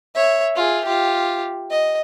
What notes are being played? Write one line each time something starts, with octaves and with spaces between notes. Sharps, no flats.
C#5 E5
F4 G#4
F4 G4
D#5